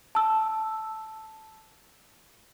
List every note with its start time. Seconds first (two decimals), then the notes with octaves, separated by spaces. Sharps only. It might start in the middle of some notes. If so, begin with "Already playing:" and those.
0.15 A5 E6